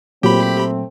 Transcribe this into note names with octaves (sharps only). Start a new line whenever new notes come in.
A#2 F#3 A3 C4 G4 B5